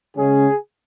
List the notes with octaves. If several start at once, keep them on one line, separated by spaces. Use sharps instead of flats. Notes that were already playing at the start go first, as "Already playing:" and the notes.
C#3 G#3 C#4 G#4